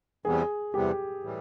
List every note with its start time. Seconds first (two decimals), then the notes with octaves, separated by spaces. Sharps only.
0.25 E2 C3 E3 G3 B3 G#4
0.74 E2 C3 E3 G3 B3 G4
1.23 A2 E3 G3